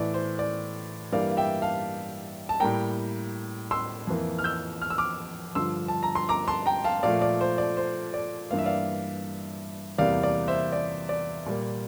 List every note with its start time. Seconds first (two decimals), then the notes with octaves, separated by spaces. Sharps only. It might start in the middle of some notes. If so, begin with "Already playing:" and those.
Already playing: A2 E3 A3 D5
0.14 C5
0.39 D5
1.12 G2 E3 G3 A#3 D5 F5
1.31 F5
1.37 E5 G5
1.62 F5 A5
2.49 A5
2.60 A2 G3 A#3 G5 A#5
3.71 C6 E6
4.07 F2 E3 A#3
4.39 F6
4.44 E6 G6
4.82 F6
4.90 E6
4.98 D6 F6
5.55 G2 D3 F3 C6 E6
5.88 A5
6.03 A#5
6.15 C6
6.29 A#5 D6
6.47 A5 C6
6.66 G5 A#5
6.84 F5 A5
7.03 A#2 F3 A3 D5 F5
7.22 D5
7.41 C5
7.58 D5
7.77 C5
8.14 D5
8.51 G2 E3 A#3 F5
8.58 E5
8.66 D5 F5
9.98 E2 C3 G3 A#3 D5 F5
10.23 D5
10.48 C5 E5
10.72 D5
11.09 D5
11.46 A#2 G3 A#3